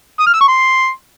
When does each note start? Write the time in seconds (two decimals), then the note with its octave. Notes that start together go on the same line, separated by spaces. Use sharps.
0.19 D#6
0.27 F6
0.34 E6
0.41 C#6
0.48 C6